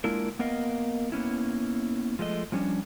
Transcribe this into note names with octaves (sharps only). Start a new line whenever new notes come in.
G#3 A#3 D4 E4 F4 A#4
A#3 B3 A#4 D#5 F5
A#3 B3 C#4 E4
F3 G#3 A3 D#5
F3 G3 C#4 D4